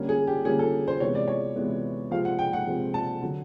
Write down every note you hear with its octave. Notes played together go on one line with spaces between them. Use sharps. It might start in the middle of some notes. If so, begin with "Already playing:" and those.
Already playing: D3 G3 A#3 C#4
G#4
G4
D3 G3 A#3 C#4 G#4
A4
C5
C3 E3 G#3 B3 C#5
D5
C#5
C3 E3 G#3 B3
C3 F3 G#3 C4 F5
F#5
G5
F#5
C3 F3 G#3 C4
A5
D3 F#3